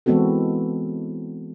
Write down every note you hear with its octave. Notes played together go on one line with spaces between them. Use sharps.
E3 G#3 B3 C4 F#4 A4